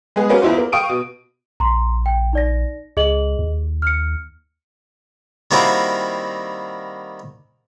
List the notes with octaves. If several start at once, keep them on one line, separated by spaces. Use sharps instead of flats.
G#3 B3 G#4
A#3 C#4 F#4 B4
E2 E4 F4 C5
A#3
F5 G5 C#6 D#6 D7 D#7
B2
A#1 A#5 C6
G5
D#4 D5 A#6
C#2 G#4 D#5 F#7
D#2
F6 C#7
D#3 G3 A#3 C4 E4 F#4